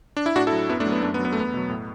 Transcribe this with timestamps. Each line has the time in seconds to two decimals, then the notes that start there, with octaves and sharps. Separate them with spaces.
0.17 D4
0.26 E4
0.36 A2 D4 F#4
0.47 E4 A4
0.53 F#3
0.69 F#2 B3 E4
0.80 A3 D4
0.86 F#3
0.92 B3
1.03 F#2 A3 D4
1.14 B3
1.19 F#3
1.25 B3
1.33 A3
1.36 E2 B3
1.54 B2 F#3
1.70 A2